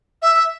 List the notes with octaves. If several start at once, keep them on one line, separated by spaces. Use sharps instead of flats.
E5